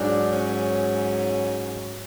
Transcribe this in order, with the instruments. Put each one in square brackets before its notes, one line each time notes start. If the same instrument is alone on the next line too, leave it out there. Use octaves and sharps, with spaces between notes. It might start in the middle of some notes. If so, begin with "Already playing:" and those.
Already playing: [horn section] G#2 F#3 D4
C#4